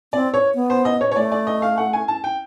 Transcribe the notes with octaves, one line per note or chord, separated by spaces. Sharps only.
C4 D5
C#5
B3
C5
D#5
C#5
C#5
A3 D5
D5
D#5
F5
F#5
G#5
A5
G5